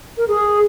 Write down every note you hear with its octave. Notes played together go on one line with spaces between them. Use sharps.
A#4
G#4